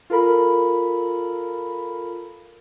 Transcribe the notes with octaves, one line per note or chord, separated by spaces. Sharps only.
F4 A4 A#4 B5